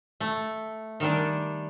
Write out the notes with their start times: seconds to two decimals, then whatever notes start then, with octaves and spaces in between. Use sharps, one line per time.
0.20 A3
1.00 D#3 G3 D4